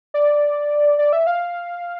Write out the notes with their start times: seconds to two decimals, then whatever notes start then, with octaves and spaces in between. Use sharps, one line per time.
0.14 D5
0.99 D5
1.13 E5
1.27 F5